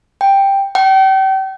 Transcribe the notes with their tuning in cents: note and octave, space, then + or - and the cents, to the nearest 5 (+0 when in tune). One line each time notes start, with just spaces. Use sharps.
G5 +5
G5 -35